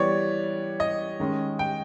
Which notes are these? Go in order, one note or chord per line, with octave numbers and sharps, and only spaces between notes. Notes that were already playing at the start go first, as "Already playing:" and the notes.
Already playing: E3 G3 B3 C#5 D5
D#5
D#3 G#3 C#4
G5